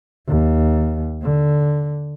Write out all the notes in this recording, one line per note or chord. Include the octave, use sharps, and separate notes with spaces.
D#2
D3